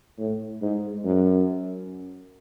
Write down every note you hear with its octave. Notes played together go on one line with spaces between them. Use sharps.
A2
G#2
F#2